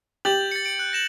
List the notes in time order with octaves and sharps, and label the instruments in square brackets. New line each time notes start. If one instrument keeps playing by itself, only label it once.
[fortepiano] G4 [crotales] G6 A6 F#7
[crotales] A6 C#7
C#7 D7
F#6
A#6 E7 F#7